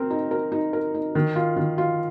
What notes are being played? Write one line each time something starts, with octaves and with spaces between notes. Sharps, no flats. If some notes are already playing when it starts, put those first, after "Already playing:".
Already playing: C4 A#4
D#4
A#4
D#4
A#4
D#4
D#3
F4
D#3
F4